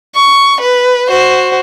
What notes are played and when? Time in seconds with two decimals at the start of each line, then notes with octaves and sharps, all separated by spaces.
0.15 C#6
0.61 B4
1.08 F#4 C5